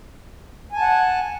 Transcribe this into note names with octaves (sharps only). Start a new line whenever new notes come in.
F#5 G#5 A5